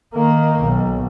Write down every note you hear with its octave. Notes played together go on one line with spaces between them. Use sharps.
D#3 A#3
B1